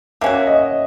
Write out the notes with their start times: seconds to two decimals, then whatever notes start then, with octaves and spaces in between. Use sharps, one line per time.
0.21 A#3 C#4 F#4 E5
0.47 D#5